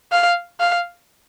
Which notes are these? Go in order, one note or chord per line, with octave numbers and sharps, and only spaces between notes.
F5
F5